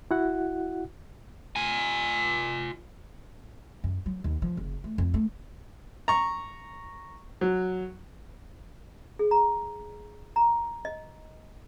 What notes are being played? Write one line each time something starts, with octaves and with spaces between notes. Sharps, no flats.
E4 F#4 F#5
F4 G#5
F#2
F#3
D#2
F3
F#1
A3
F2
A3
A#5 C#6
F#3
G#4
A#5
A#5
D#5